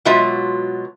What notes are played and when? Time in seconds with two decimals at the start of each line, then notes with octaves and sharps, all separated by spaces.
0.05 B2 F#3 G#3 F4 E5